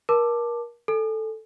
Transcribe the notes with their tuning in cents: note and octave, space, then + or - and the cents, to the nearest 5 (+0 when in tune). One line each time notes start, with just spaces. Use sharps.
A#4 +30 A5 +0 D6 +10
A4 +0 G#5 +0